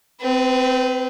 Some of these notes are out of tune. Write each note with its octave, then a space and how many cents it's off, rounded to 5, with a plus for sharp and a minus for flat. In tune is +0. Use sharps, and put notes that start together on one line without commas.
C4 -20 B4 +15